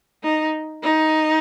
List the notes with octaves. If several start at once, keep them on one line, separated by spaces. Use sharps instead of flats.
D#4
D#4